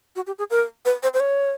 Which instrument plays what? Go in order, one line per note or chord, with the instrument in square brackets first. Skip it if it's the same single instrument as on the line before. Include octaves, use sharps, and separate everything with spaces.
[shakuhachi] F#4
G4
G#4
A#4
B4
C5
C5
C#5